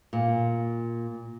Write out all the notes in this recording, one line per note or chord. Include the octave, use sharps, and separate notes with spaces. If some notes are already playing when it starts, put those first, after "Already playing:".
A#2